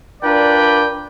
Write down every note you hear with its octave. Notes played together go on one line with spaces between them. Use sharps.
D4 F4 A#4 B4 D5 G5